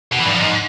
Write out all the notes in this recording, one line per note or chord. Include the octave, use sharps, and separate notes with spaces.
B2
E3
G2
F3
G#2